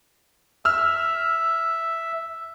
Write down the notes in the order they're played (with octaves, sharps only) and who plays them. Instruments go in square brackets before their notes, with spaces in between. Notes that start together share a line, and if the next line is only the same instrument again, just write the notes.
[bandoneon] E5 [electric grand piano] E6 F6